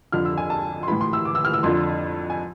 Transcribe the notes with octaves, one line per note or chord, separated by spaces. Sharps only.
F2 D3 F3 F6
E6
G#5
A5
C6
A2 E3 B5
C6
E6
D6
E6
F6
E6
F2 D3 F3 C6
G#5